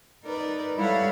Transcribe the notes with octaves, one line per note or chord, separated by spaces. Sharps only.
D#4 A#4 B4 D5
G3 E4 A4 C#5 F5 F#5